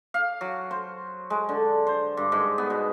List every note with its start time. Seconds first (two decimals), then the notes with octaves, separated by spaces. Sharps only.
0.14 F5
0.41 F#3
0.71 C5
1.30 G#3
1.49 D3
1.87 C5
2.17 G2
2.32 G#2
2.58 B3
2.70 B2